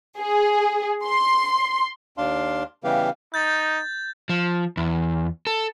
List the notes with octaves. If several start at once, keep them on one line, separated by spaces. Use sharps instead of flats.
G#4
C6
D#2 D4 F5 C6
C#3 E3 G3 B3 G4 F5
D#4 G6 A6
F3
E2
A4